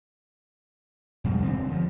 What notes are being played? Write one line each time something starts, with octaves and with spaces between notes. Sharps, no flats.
F2 B2 G3 G#3
E1 D3 C4
G2 F3